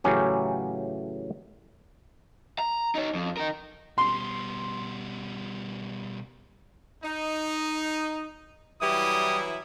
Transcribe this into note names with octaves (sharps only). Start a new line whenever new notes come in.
A2 C#3 E3 F#3 C#4 G4
A#5
D#4 C#5
F2
D#4 A#4
B2 G3 C6
D#4
E3 F#3 G3 E4 G4 D#6